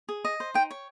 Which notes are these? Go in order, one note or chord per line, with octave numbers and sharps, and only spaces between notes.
G#4
D#5
C5
D#4 G5
C#5